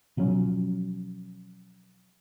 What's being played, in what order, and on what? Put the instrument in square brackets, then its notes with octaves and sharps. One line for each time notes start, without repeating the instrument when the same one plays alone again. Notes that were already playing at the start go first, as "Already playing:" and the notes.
[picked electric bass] B2 F3 F#3 C#4